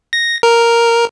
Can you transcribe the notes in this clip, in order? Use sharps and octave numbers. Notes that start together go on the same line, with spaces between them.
A#6
A#4